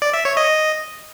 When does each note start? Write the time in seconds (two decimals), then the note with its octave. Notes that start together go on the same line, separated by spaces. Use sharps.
0.02 D5
0.14 E5
0.25 C#5
0.37 D#5